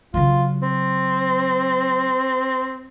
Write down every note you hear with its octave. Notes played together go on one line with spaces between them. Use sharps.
C#3 F#3 F4
C4